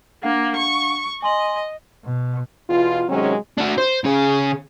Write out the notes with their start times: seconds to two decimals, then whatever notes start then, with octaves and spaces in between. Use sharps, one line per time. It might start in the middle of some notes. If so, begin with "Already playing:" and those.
0.23 A#3 D4 F5 F#5
0.56 C#6
1.22 D#5 G#5 C6 F#7
2.04 B2
2.70 E2 B2 F4
3.09 C3 D#3 F#3 G#3 C#4
3.58 D4 F#4
3.78 C5
4.04 C#3 G#4